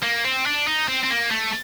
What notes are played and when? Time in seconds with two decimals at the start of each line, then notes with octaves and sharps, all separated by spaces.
0.03 A#3
0.25 C4
0.46 D4
0.67 D#4
0.88 C4
1.03 C4
1.10 A#3
1.31 A3